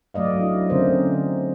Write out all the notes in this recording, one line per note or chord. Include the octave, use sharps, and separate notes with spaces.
F#3 A3 D5 D#5 F5
D4 E4
D#4
D3 A3 C4 C#4 A#4 C5